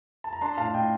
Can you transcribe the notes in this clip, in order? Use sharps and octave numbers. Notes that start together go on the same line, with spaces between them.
A5
A#5
D4 A5 C6
A2 F5 A5
F5
A2 D#5 G5